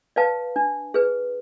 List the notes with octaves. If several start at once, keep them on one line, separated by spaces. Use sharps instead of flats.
B4 D5 F5 A5
D4
G#4 B4